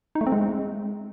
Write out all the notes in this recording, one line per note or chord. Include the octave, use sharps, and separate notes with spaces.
D#4
A3
C4
G#3